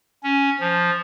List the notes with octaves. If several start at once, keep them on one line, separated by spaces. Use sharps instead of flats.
C#4
F3